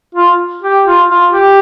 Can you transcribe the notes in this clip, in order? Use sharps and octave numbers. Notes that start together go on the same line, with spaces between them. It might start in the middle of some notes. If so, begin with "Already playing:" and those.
F4
G4
F4
F4
G4